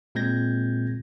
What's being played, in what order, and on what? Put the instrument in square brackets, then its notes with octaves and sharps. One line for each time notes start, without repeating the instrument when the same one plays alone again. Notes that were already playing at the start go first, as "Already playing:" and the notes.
[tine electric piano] A#2 G#3 C4 G6 G#6 A#6